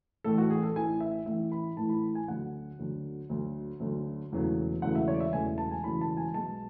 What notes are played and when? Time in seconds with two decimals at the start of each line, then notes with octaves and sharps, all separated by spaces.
0.24 A1 A2 E3 A3 A4
0.38 F#4
0.50 G#4
0.63 A4
0.76 A1 A2 E3 A3 G#5
1.00 E5
1.26 A1 A2 E3 A3 E5
1.52 B5
1.77 A1 A2 E3 A3 A5
1.89 B5
2.15 G#5
2.28 D2 D3 F#3 F#5
2.79 D2 D3 F#3
3.30 D2 D3 F#3
3.80 D2 D3 F#3
4.32 E1 E2 C#3 F#3 A3
4.82 E1 E2 C#3 F#3 A3 F#5
4.95 E5
5.08 C#5
5.14 D5
5.20 E5
5.32 E1 E2 C#3 F#3 A3 G#5
5.58 A5
5.71 G#5
5.84 E1 E2 C#3 F#3 A3 B5
6.01 A5
6.17 G#5
6.34 B1 B2 G#3 A5